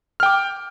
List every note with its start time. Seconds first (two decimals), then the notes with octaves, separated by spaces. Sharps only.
0.20 F6
0.23 G5
0.26 D6